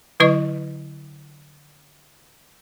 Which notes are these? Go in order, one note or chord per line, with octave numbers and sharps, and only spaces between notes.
D3 F#3 E4 B4 D#5 C#6